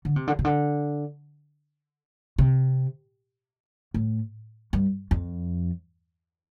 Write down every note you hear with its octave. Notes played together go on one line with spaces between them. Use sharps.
D3
C3
D3
C3
D3
C3
A2
G2
F2